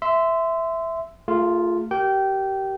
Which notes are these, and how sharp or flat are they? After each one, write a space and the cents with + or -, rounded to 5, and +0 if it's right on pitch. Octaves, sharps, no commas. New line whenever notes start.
E5 +0 C6 -20
A3 +35 F4 +0 G#4 +0
G4 -25 A#4 +0 G5 -20